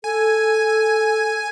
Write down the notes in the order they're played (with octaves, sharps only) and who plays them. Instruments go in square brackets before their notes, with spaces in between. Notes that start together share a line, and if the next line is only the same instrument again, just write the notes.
[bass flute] A4 [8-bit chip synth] G#5